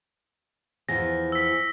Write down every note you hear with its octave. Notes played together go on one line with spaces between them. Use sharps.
E2 F3 A#6
E6 B6